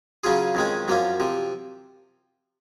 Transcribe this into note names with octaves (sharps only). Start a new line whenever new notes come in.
C#3 F#3 C#4 F4 G#4
F2 D#3 G#3 C#4
F#2 F3 A#3 C#4
C3 F3